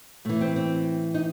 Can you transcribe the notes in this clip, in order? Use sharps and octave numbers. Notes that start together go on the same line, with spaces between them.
A2 E3 A3
C4
C4
D#4